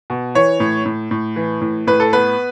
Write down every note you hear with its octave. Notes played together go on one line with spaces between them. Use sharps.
B2
E3 C#5
A2
A2
A2
E3
A2
A2 B4
A4
B3 B4